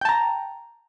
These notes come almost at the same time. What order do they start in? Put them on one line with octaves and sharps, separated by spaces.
G5 A5 A#5